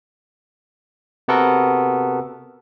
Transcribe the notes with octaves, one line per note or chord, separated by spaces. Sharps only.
C3 B3 F#4 A4 A#4